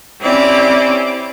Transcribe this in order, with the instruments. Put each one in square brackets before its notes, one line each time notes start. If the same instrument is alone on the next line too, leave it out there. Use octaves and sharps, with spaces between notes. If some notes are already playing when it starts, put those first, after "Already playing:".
[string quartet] C4 C#4 E4 G4 D5